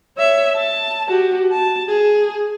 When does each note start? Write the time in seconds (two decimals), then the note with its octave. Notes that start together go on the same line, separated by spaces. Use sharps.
0.17 C#5 E5
0.56 A5
1.08 F#4 G4
1.51 A5
1.89 G#4